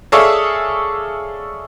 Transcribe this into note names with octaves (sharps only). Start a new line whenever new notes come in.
G#4 A4 C#5 D5 E5 F5